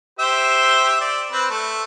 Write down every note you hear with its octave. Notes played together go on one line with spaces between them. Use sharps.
G4 C5 E5
D5
C4 B4
A3